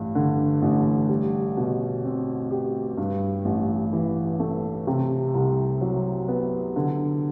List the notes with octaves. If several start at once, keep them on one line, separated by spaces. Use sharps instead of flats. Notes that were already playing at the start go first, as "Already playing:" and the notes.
Already playing: A1 G2
D3
A1
G3
B2
C4
G4
G2
A1
E3
A3
C3
C2
F#3
B3
D3